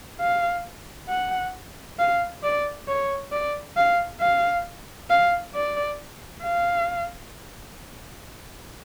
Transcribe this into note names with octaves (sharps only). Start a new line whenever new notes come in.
F5
F#5
F5
D5
C#5
D5
F5
F5
F5
D5
F5